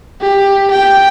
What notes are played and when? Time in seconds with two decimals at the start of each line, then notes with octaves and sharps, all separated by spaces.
0.21 G4
0.71 G5